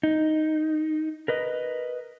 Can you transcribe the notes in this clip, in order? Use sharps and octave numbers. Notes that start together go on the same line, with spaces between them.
D#4
A#4 B4 D#5